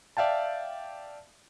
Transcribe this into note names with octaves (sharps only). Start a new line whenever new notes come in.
D5 E5 F5 G5 A5